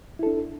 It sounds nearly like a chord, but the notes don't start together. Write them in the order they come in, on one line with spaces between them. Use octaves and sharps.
E4 A4 D4